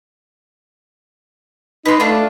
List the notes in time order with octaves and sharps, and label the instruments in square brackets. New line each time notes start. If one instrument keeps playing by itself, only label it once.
[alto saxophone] D#4 [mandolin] B4 C6
[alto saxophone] A3 [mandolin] D4 F4